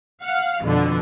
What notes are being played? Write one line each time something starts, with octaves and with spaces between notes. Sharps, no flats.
F5 F#5
F2 B2 D3